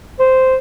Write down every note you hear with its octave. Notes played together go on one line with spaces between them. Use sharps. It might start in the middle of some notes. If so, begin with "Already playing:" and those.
C5